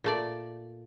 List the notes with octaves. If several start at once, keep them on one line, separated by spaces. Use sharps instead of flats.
A#2 A3 D5